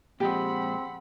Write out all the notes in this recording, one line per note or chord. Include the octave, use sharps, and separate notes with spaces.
A#2 F3 G#3 C4 G4 D#5 F#5 B5